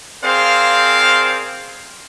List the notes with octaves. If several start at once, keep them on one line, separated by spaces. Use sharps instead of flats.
C4 G#4 A#4 C5 D5 F5